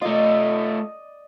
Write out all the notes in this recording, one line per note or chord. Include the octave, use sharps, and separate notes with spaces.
A3 F4 D5 D#5